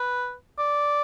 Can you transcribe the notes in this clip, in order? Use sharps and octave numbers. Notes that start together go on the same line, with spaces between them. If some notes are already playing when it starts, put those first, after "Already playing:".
Already playing: B4
D5